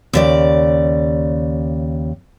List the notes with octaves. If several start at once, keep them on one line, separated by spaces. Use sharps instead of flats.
D#2 C#3 D5